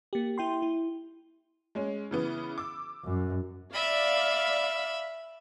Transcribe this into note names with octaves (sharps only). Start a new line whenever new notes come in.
A#3 G4
E4 G5 C6
E4
G#3 C#4
C#3 E3 B3
D6 E6
F#2
D5 E5 F5 B5